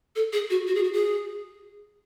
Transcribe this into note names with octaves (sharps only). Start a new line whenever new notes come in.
A4
G#4
F#4
F#4
G#4
F#4
G#4